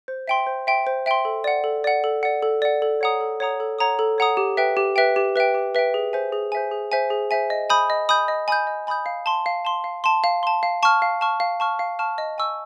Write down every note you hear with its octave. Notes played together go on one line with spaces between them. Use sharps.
C5
E5 G5 C6
C5
E5 G5 C6
C5
E5 G5 C6
A4
D5 F#5
A4
D5 F#5
A4
D5 F#5
A4
D5 F#5
A4
C#5 F#5 A#5 D#6
A4
C#5 F#5 A#5 D#6
A4
C#5 F#5 A#5 D#6
A4
C#5 F#5 A#5 D#6
G4
B4 E5 G5
G4
B4 E5 G5
G4
B4 E5 G5
G4
B4 E5 G5
G#4
C5 E5 G#5
G#4
C5 E5 G#5
G#4
C5 E5 G#5
G#4
C5 E5 G#5
D#5
G#5 B5 D#6 G6
D#5
G#5 B5 D#6 G6
D#5
G#5 B5 D#6 G6
D#5
G#5 B5 D#6 G6
F5
A5 C6
F5
A5 C6
F5
A5 C6
F5
A5 C6
F5
A5 C#6 F6
F5
A5 C#6 F6
F5
A5 C#6 F6
F5
A5 C#6 F6
D#5
G#5 C#6 E6